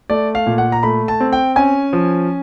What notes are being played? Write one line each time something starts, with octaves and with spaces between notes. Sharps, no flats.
A3 D5
F5
A#2
F#5
A#5
A3 B5
A5
C4
G5
C#4 G#5
F3